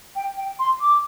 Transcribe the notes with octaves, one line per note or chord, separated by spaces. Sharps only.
G5
G5
C6
D6